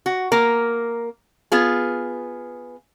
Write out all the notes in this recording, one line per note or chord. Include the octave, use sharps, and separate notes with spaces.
F#4
A#3 A#4
B3 F4 G#4